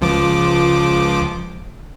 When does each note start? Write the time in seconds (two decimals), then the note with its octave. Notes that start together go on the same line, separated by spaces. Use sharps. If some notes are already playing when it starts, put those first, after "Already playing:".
0.01 C#2 F3 D6